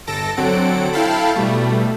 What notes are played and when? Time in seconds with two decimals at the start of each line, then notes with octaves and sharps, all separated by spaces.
0.07 G1 A4 A5 A#6 D7
0.37 D3 F#3 C4 A4 F#5 D7
0.93 E4 A4 F5 G5 A5 B5
1.36 B2 G3 A3